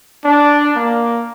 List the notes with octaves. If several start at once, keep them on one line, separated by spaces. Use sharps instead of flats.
D4
A#3